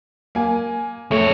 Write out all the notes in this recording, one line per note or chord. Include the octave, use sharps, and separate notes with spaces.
A#3 G#5
F2 A3 C#5